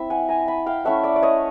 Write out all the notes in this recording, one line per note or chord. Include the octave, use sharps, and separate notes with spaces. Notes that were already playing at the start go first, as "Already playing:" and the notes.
Already playing: C4 E4 E5
F#5 G#5
G#5 A#5
A5 B5
F5 G5
A3 C#4 E4 E5 F#5
D5 E5
D5
C#5 D#5